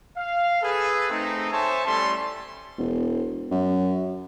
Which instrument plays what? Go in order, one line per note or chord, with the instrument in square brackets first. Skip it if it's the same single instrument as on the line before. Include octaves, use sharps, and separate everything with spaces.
[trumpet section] F5
G#4 A4 B4
A3 C4 D#4
C5 C#5 E5 G#5 A5
G3 A3 C#4 E4 A4 C6
[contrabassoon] E1
F#2